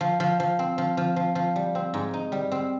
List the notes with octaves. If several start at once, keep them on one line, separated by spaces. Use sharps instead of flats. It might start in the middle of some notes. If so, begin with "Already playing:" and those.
F3
F3
F3
C4
F3
F3
F3
F3
G3
C4
G#2
D#4
G3
C4